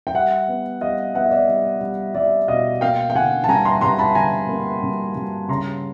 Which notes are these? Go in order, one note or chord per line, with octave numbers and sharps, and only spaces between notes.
G5
G3 E5 F#5
B3
G3 D#5 F5
B3 E5 F#5
D#5
D5 E5
G3
G3
G3 D5 E5
B2 D#5 F5
A#3 F5 G5
G5
D3 F#5 G#5
A5
G2 G#5 A#5
A#5 C6
G2 A#5 C6
A5 B5
D3 G#5 A#5
A#3
G2
G2
C#3 A#5 C6